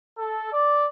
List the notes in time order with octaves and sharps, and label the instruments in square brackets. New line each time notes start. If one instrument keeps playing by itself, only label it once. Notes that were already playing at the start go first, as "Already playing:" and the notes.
[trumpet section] A4
D5